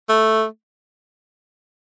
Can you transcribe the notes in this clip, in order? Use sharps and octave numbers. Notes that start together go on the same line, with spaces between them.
A3